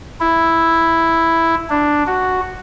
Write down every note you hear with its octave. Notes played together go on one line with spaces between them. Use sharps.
E4
D4
F#4